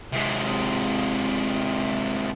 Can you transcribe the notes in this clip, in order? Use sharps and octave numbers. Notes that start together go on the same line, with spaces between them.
C3 G#3